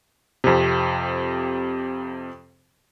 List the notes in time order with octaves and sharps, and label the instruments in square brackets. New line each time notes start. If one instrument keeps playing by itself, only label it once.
[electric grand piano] F2 C3